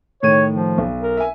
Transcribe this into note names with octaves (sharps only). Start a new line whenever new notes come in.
A2 D#3 C#5 D#7
F3
B1
A#4
E5 G#5